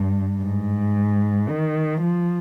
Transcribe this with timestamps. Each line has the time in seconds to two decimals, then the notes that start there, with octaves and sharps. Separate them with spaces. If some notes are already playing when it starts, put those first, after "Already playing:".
Already playing: G2
0.43 G#2
1.49 D#3
2.01 F3